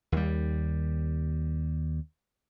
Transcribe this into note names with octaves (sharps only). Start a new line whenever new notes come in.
D#2 G3